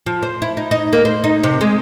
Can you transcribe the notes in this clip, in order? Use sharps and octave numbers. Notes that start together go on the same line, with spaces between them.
F3
C5
E4
D#4
D#4
A#3
C5
D#4
C3
G#3